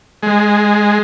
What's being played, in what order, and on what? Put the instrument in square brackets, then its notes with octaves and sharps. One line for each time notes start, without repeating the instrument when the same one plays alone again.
[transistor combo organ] G#3